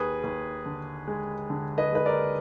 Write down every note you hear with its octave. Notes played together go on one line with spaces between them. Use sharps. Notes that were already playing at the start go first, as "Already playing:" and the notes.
Already playing: D#2 G#4 B4
D#2
D3
G#3
D3
B4 D#5
G#3 B4
A#4 D5